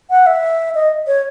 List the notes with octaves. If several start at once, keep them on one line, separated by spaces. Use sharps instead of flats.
F#5
E5
D#5
C#5